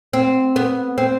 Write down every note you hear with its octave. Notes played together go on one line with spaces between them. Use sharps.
C4
B3
C4